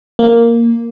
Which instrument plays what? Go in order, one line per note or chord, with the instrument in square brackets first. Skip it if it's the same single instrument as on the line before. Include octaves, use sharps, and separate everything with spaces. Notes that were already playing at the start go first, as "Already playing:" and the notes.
[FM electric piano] A#3